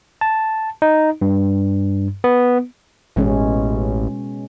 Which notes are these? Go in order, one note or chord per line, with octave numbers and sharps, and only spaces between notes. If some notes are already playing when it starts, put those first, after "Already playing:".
A5
D#4
G2
B3
A1 B2 G#3 C#4